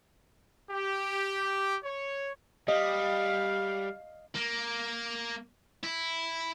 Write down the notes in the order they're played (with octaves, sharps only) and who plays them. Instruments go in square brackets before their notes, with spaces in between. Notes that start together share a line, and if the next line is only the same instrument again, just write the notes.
[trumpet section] G4
C#5
[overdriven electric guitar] G3 [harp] D#5 [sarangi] F5
[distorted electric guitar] A#3
E4